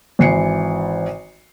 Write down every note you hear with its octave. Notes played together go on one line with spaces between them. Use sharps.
G#1 E3 C7 C#7